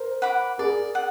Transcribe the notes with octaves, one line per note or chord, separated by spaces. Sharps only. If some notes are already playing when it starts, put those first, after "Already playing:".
Already playing: A#4 C5
F#5 B5 D6
G#4 A#4 D5
F#5